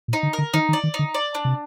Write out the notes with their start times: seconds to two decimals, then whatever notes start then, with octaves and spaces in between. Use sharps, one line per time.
0.08 A#2
0.13 D#4
0.23 D3
0.33 A#4
0.38 D3
0.54 D#3 D#4
0.69 D#3
0.73 D5
0.84 D#3
0.94 D#4
0.99 D3
1.14 D5
1.35 D4
1.45 C3